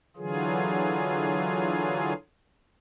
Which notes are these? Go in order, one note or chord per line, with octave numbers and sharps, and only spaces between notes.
D3 E3 F#3 F4 G#4